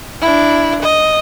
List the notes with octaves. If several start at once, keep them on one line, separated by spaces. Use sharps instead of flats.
D4 E4
D#5